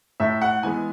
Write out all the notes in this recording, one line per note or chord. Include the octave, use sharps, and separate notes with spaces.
A2 E5
F#5
E3 G#3 B3 G#5